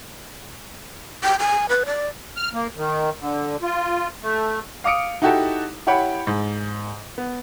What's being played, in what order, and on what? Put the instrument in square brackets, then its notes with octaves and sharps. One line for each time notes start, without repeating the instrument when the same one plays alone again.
[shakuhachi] G5
G#5
B4
D5
[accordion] F6
A#3
D#3
D3
F4
A3
[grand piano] F5 D6 D#6 C#7 D7
D#4 E4 F#4 G4 A4 A5
E4 G4 C#5 F#5 G5 B5
G#2
B3